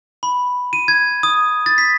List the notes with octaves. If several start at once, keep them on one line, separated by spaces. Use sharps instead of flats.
B5
D#7
G#6
D#6
A6
B6